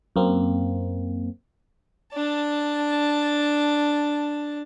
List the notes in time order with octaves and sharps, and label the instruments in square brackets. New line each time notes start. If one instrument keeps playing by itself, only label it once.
[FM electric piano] F#2 A#3 C4
[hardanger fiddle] D4 A5